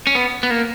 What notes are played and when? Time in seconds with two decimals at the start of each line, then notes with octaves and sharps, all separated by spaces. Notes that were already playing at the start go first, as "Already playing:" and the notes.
0.07 C#4
0.15 B3
0.43 B3
0.50 A#3